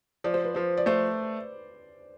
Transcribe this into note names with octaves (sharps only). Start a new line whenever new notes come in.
F3 D5
C5
B4
F3 C5
D5
A3 C5